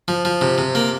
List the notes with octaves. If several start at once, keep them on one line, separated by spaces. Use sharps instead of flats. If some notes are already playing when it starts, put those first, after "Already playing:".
F3
F3
C3
C3
A#3